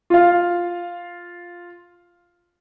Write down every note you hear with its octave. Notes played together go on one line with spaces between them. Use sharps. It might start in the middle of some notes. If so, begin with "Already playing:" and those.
F4 F5